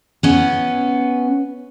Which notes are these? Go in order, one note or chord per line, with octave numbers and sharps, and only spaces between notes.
B3 C#4